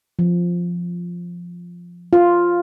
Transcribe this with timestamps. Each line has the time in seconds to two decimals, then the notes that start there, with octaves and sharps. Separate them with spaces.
0.19 F3
2.13 F4